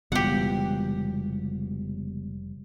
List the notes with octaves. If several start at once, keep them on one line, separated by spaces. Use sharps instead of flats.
F1 C#2 B2 E3 G3 G4 F#5